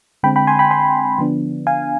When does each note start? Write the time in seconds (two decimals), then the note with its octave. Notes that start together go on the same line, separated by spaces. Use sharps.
0.23 D3 G#3 C4 G5 B5
0.36 G5 B5
0.47 G#5 C6
0.59 G5 B5
0.71 G#5 C6
1.18 D3 F3 B3 D4
1.67 F5 G#5